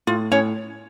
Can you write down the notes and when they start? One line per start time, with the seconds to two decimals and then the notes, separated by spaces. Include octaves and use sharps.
0.07 A2 F4
0.31 A2 C#4 C#5